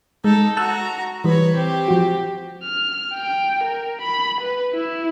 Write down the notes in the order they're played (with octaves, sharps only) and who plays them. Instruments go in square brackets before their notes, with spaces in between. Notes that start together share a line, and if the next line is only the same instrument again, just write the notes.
[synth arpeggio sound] G#3 [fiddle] D#4 A4
[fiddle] F#4 A#5 [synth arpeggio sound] A5 E6 F#6
[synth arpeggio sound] E3 G3 [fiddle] B4 C#5
[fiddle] C4 G4
[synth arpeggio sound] F3 F#4
[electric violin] F6
G5
A#4
B5
B4
E4